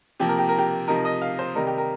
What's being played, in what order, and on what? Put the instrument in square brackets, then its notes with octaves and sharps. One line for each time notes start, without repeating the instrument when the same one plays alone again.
[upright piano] C3 F3 A#3 G4
A#4
G4
A#4
G4
C3 F3 D#4 A#4
D#5
F5
C5
C3 D#3 G3 D#4 A#4
G4
A#4